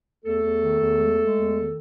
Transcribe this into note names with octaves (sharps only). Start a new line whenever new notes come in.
E2 A3 A4
E2
D#3
E2
G#3
G#3
E2
D#3